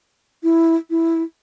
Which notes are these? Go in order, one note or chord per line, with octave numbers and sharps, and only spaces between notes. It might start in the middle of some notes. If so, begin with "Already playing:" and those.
E4
E4